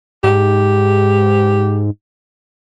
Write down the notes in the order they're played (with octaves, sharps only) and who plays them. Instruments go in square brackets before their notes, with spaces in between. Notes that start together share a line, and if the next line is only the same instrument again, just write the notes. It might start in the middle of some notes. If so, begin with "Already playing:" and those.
[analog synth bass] G#2 [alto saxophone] G4